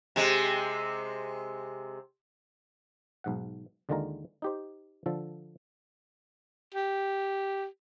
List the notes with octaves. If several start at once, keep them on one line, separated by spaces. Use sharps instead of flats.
C3 G#3
B1 G#2 F#5
D#2 D3 D#3 G#3 F4 A#5
D#4 G4 C5
D3 F3 A4
G4